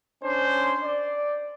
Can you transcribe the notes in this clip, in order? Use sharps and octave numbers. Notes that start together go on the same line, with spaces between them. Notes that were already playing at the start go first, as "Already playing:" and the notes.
C#4 D4 C5
D5